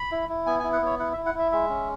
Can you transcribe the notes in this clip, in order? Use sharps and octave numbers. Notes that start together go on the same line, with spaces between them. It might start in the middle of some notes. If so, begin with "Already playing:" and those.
Already playing: B5
E4
E4
B3 G#5
G#5
E4
F#5
B3 C#5
E4 F#5
E5
E4
F#5
E4 E5
G#3 E5
C#4